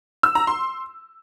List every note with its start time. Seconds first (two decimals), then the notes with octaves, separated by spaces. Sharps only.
0.23 E6
0.35 A#5
0.47 C6